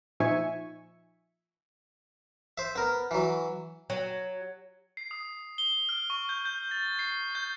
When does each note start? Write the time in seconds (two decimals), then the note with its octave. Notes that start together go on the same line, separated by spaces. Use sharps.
0.20 A#2 F3 D#4 E5 G#5 C#6
2.58 C5 E5
2.76 B3 A#4
3.11 E3 F#3
3.90 F#3
4.97 C7
5.11 D#6
5.58 G7
5.89 F6
6.10 C#6
6.29 G6
6.45 G6
6.71 A6
6.99 C7
7.35 G6